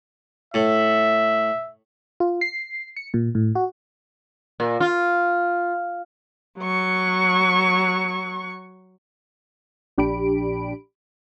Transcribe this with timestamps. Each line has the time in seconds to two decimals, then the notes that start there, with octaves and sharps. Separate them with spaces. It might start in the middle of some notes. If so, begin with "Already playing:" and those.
0.54 A2 E5
2.20 F4
2.41 C7
2.96 C#7
3.14 A#2
3.35 A2
3.55 F#4
4.60 A#2
4.80 F4
6.59 F#3 C#6
9.98 A#1 D4 G4 B5 D7